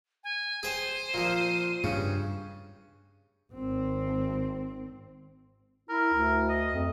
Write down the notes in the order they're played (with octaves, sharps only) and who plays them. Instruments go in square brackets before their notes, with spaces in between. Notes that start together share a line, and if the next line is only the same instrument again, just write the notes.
[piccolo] G#5
[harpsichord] G#4 G5 [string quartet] C5 [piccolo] D#7
[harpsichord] A#2 F3
[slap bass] G2 [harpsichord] C#3
[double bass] G#1 C4
[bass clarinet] E4 [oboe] A#4
[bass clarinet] D2
[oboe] D#5
[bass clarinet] F2